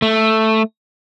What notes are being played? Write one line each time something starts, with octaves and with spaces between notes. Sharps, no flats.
A3